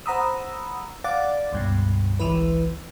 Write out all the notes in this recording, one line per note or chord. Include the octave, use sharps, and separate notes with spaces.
C5 F#5 A#5 B5 D#6 E6
D5 F5 F#5 D6 A6
C#2 G2 B2
G#1 C#2 E3 E4 B4